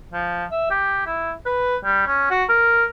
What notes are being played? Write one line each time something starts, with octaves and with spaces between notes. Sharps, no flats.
F3
E5
G4
E4
B4
G3
C#4
F#4
A#4